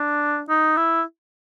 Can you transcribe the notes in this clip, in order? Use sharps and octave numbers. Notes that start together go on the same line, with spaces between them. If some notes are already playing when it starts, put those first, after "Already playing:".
Already playing: D4
D#4
E4